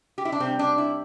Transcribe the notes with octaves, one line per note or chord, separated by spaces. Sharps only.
G4
E4
D4
C3 G3 C4
D4
E4